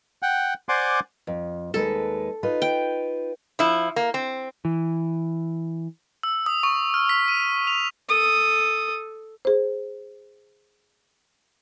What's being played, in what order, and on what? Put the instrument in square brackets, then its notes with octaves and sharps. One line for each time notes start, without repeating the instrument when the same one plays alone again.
[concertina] F#5 G5
C5 D5 F#5 G#5 C6 D6
[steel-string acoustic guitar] F2
[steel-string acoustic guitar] D#2 G#3 B4 [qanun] A4
[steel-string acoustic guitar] D#4 F4 B4
[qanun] G5
[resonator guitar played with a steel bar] F3 E4
A#3
C4
[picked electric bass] E3
[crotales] E6
D#6
C#6
F6
B6
D#7
F7
[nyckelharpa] A4 D#6
[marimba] G#4 C5